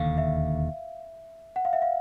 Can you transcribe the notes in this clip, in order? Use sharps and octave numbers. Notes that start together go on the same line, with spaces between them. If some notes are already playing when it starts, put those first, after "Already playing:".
Already playing: E1 D#2 D3 F5
E5
F#5
F5
E5
F5